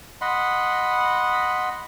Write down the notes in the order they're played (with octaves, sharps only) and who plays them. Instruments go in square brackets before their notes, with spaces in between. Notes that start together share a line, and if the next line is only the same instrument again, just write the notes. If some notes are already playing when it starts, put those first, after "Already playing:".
[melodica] D#5 F#5 B5 C6